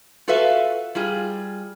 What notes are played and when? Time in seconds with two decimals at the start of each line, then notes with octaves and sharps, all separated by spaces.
0.28 F4 F#4 A4 B4 E5 F5
0.95 G3 F4 G#4